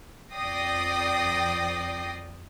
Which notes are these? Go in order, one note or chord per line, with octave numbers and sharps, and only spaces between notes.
F2 D5 G5 D#6 A#6 C7